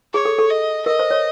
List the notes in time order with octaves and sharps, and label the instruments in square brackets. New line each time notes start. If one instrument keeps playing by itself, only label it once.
[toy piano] G#4 [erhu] C#5
[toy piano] A4
A4
[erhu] D#5
[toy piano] A#4 [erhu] D#5
[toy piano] C5
C#5